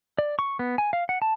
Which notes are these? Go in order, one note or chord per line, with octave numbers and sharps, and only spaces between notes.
D5
C#6
B3
G#5
F5
F#5
A5